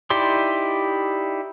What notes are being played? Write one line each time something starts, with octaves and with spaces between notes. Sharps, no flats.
D#4 E4 G4 D5 C6